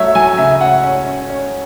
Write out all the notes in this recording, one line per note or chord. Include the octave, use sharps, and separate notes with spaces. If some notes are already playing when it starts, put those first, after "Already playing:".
Already playing: F#3 A3 C#5 E5
F#3 G#5
C#3 E5
E5
C#4 F#5
C#4
C#4
C#4